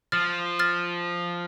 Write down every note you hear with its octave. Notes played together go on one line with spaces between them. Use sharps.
F3 F6 A6
F6 A6